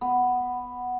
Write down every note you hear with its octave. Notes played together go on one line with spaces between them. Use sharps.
B3